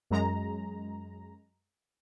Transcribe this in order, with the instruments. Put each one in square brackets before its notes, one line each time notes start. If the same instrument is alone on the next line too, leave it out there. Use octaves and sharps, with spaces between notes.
[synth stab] F#2 G#3 A#5